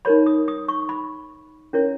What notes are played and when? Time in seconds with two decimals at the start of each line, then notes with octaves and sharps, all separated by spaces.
0.05 D#4 A#4 C#5 B5
0.26 D#6
0.48 D#6
0.68 C#6
0.89 B5
1.73 C#4 E4 A#4 C#5